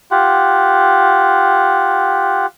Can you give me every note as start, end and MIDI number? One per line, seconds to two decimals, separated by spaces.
0.11 2.46 65
0.11 2.46 67
0.11 2.46 78